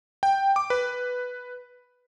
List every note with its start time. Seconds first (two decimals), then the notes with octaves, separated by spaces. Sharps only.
0.23 G5
0.56 D6
0.70 B4